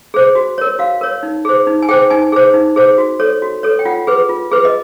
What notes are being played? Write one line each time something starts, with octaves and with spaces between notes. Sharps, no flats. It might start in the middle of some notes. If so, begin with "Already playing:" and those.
G#4 C5
F#4
A#4 C#5
F#4 F5
A#4 C#5
D#4
G#4 C5
D#4
G#5
G#4 C5 G5
D#4 G#5
G#4 C5
D#4
G#4 C5
F#4
A4 C#5
F#4
A4 C#5
G5
F4 F#5
G#4 B4
F4
G#4 B4
D#5